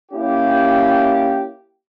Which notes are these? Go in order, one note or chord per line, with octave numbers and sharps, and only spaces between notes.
A#3 C#4 E4 G4